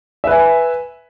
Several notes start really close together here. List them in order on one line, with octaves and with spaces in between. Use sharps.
E5 B4 G#5